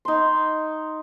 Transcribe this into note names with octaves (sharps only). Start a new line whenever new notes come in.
D#4 C6